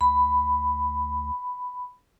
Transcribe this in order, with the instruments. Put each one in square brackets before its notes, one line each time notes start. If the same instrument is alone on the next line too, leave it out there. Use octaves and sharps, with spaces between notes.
[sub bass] D2 [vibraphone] B5